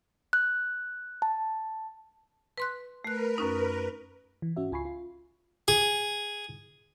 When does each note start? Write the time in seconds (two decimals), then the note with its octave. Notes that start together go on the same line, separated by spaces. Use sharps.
0.33 F#6
1.22 A5
2.58 B4 C6 F#6
3.05 A3 A#4 B4 F#6
3.38 F#2 C#4 D#4
4.42 E3
4.56 G#2 C#4 F#4 E5
4.72 C#2 F4 G#5 B5 C#6 C7
4.85 F4
5.68 G#4